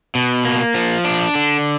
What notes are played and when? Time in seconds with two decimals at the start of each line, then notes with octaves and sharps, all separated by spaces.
0.15 B2
0.45 A#3
0.74 F3
1.05 D4
1.35 D3